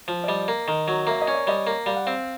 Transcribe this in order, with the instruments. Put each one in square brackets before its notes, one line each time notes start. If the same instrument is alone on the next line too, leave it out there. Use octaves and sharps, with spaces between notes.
[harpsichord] F3
[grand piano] D5
[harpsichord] G3 [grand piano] D#5
[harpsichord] A#3
D#3
F#3
[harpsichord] A#3 [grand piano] E5
[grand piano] D#5
[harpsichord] C#4
[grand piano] D5
[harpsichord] G3 [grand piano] D#5
[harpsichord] A#3
[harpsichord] G3 [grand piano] F5
[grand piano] F#5
[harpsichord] C4 [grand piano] F5